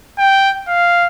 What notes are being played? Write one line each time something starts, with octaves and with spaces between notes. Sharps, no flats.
G5
F5